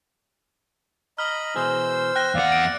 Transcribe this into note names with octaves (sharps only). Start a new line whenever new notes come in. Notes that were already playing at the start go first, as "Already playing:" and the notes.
D#5 A#5 B5 F6 G7
B2 E3 G#4 C5 E6
G5 F#6 A#6
E2 D5 F5 F#5
D7